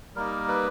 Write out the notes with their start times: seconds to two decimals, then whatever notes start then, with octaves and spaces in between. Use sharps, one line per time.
0.16 G3 A#3 D#4 A#4
0.48 B4